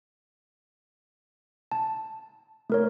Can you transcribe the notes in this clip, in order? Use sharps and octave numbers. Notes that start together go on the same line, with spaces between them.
A5
A3 A#4 C#5